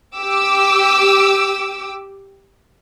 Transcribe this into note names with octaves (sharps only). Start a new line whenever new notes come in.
G4 D6 E6